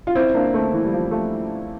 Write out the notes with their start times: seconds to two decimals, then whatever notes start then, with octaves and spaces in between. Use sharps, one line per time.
0.07 F4
0.15 C4 E4
0.34 A#3 D4
0.54 A3 C4
0.73 E3
0.84 G3
0.92 F3
1.11 F3 A3